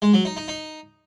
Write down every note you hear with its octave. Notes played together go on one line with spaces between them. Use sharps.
G#3
F#3
D#4
D#4
D#4